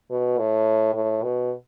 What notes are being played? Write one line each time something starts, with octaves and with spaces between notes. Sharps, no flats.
B2
A2
A2
B2